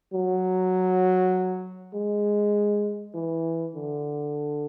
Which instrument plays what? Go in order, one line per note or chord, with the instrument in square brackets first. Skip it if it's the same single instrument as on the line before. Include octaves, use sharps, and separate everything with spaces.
[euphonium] F#3
G#3
E3
D3